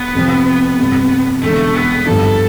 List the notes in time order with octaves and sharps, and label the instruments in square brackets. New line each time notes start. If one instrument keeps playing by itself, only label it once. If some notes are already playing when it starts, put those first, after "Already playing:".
Already playing: [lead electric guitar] B3
[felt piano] F2 C3 F3 C4
G1 F2 C3
[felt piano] E1 E2 D3 [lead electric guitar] A3
[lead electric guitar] B3
[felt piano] G2 D3 F3 B3 D4 [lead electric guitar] A4